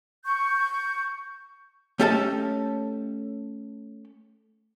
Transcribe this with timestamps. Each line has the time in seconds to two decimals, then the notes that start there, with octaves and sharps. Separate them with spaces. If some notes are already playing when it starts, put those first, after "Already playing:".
0.25 C#6 G6
1.99 A3 C#4 G4 A4 D#5 A5